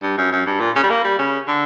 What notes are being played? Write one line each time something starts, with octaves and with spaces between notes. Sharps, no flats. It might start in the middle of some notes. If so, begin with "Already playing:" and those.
G2
F#2
F#2
G2
A#2
C#3
G3
A#3
G3
C#3
D3